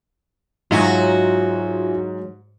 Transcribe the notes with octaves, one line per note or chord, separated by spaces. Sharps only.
G#2 F#3 D#4 F4 F#4 E5 G#5